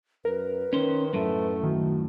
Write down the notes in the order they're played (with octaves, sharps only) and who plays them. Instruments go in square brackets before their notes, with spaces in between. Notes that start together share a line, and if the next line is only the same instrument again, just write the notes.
[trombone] F#2 [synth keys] A#4 [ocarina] B4
[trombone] D#3 [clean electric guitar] C#4 C5
[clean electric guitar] F#2 A2 [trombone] A3
[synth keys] D#3 [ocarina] F#4